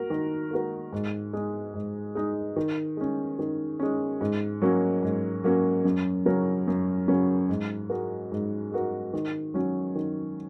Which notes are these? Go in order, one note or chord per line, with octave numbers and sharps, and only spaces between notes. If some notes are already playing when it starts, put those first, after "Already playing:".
Already playing: A#3 F#4 A#4
D#3
A#3 F#4 A#4
G#2
G#3 D#4
G#2
G#3 D#4
D#3
G#3 C#4
D#3
G#3 C#4
G#2
F#3 A#3 C#4
G#2
F#3 A#3 C#4
F#2
C#3 F#3 C#4 A#4
F#2
C#3 F#3 C#4 A#4
G#2
G#3 F#4 A#4
G#2
G#3 F#4 A#4
D#3
F#3 C#4
D#3